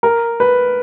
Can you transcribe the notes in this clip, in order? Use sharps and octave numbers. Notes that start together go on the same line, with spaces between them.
A#4
B4